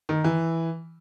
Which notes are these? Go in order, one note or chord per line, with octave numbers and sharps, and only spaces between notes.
D#3
E3